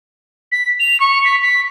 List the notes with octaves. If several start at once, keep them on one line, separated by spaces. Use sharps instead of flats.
B6
F7
C#6
B6
B6